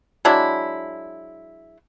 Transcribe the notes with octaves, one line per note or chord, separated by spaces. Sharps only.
F#3 G#3 D4 E4